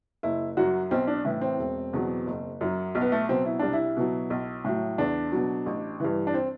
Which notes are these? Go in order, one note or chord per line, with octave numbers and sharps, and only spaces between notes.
F#1 E4
F#2 F#3 F#4
B1 C4
D4
A2 E3 E4
C4
E1
E2 B2 F#3
F#1
F#2 F#3
B1
B3
A3
B2 F#3 C4
E4
C2 D4
E4
B2 F#3
B1
A2 F#3
E2 D4
B2 F#3
A1
G2 E3
D4
C4